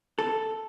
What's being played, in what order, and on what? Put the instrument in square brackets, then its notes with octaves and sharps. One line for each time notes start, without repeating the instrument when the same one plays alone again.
[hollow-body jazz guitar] A4